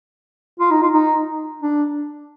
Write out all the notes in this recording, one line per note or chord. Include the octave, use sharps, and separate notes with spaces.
F4
D#4
F4
D#4
D4